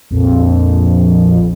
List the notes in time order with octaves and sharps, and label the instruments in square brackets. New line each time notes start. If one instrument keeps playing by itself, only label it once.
[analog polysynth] A#1 F2